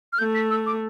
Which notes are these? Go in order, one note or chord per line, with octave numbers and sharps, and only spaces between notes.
F6
A3 G6
B6
E6
D6